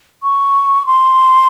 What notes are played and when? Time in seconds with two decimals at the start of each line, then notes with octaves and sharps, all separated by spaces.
0.23 C#6
0.86 C6